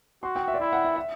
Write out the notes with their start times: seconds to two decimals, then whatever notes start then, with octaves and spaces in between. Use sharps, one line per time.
0.23 F#4 C6
0.36 G5
0.48 E5
0.54 D5
0.60 E4 E5
0.73 F#5
0.85 E5
0.96 E5